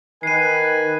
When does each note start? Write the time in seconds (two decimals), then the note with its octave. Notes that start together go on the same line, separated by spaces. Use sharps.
0.23 D#3 B4 G#5 C7 D#7